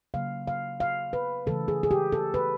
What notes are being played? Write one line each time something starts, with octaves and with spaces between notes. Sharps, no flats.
C#3 F#3 A#3 F5
F5
F5
B4
C#3 E3 A3 A4
G#4
G#4
G4
A4
B4